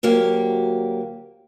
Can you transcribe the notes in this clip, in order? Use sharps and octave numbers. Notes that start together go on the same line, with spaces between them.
D2 F#3 A#3 G4